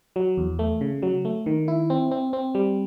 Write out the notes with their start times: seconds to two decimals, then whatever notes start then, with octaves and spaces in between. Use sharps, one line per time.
0.16 F#3
0.38 E2
0.59 A3
0.81 C#3
1.03 F#3
1.25 A3
1.46 D#3
1.68 E4
1.90 C4
2.11 C4
2.33 C4
2.55 G3